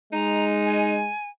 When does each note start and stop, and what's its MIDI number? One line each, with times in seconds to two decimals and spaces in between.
0.13 1.11 56
0.13 1.00 63
0.13 0.45 82
0.66 1.29 80